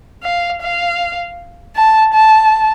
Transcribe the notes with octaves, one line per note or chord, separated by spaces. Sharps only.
F5
F5
A5
A5